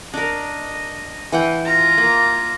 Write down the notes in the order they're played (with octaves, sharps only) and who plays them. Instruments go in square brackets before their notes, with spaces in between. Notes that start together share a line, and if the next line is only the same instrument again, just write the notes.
[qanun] D4 A#4 [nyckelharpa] D#5
[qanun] E3 F#5 G5
[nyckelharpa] F4 A#5
[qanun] A#3